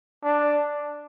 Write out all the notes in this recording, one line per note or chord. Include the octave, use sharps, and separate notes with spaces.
D4